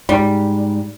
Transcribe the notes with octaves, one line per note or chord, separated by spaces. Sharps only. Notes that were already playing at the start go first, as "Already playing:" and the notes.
G#2 G3